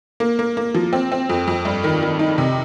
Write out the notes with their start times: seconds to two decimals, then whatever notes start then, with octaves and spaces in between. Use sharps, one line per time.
0.20 A#3
0.39 A#3
0.57 A#3
0.75 F3
0.93 C4
1.12 C4
1.29 F2
1.47 F2
1.65 G2
1.84 D#3
2.02 D#3
2.19 D#4
2.38 C3